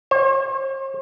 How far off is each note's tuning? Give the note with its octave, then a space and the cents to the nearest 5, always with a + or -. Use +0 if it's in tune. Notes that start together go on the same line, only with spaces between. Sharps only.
C5 +45